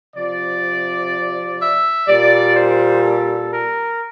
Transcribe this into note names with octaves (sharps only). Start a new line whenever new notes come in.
C3 F3 D5
E5
A#2 G3 D5
C5
A4
A#4